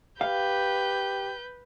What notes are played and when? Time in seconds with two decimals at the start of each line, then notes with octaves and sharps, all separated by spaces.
0.21 G4 B4 F5 G6